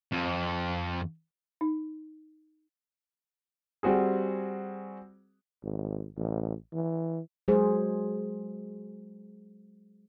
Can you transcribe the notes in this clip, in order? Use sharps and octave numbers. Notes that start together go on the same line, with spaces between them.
F2
D#4
G3 C4 F#4 G#4
G#1
A1
E3
F#3 G#3 G#4 C5